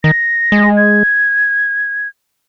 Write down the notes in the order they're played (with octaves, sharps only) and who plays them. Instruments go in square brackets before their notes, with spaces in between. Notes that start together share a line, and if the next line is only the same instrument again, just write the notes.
[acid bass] D#3 [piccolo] A#6
[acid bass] G#3
[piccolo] G#6